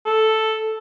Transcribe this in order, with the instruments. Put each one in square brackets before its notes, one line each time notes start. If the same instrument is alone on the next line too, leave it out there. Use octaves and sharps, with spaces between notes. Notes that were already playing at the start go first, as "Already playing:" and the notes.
[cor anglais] A4